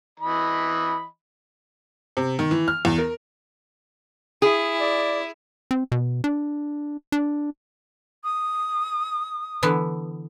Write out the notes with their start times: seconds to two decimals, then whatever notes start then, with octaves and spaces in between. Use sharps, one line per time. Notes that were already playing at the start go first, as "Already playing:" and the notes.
0.20 E3 D#5 B5
2.17 C3
2.39 D#3
2.51 E3
2.68 F6
2.85 E2
2.98 A#4
4.42 E4 G#4
4.81 D5
5.71 C4
5.92 B2
6.24 D4
7.12 D4
8.24 D#6
9.63 D3 E3 B3